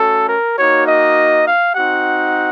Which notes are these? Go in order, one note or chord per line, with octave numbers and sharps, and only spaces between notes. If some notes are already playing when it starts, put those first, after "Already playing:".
Already playing: A3 C#4 F#4 A4
A#4
A#3 D#4 F#4 C#5
D#5
F5
C4 D#4 F#4 F#5